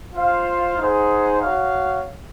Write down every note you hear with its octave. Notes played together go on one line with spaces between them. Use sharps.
F4 C5 F5
D#4 G#4 C5 F#5
F#4 C#5 F5